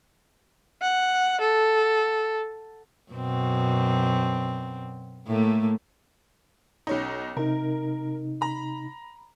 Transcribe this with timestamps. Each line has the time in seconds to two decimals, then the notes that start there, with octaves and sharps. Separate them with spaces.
0.82 F#5
1.41 A4
3.12 F#2 B2 C4
5.27 A2 A3 A#3
6.87 B1 C#4 D#4
7.37 C3 D#4 A#4
8.41 A#5 B5